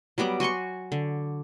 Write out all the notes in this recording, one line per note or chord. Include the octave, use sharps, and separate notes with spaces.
F#3 G3 B3 D6
F#4 G#5 C6 C#6
D3